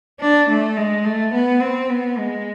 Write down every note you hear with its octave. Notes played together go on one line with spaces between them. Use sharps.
D4
A3
G#3
A3
B3
C4
B3
G#3